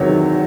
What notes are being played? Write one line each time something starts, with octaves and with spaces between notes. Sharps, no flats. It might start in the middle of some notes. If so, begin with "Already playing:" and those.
Already playing: E2 C3 D#3 F#3 C#5